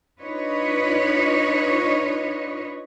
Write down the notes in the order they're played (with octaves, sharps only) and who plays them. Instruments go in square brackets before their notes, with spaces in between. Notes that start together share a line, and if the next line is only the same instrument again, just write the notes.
[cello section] D4 D#4 F4 B4 C#5 D#5